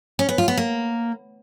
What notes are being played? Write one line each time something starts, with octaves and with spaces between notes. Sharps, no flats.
C#4
B3
F4
B3
A#3